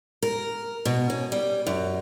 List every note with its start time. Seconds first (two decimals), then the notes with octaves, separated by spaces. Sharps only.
0.23 A#4
0.85 B2
1.10 C#4
1.32 G3
1.67 F#2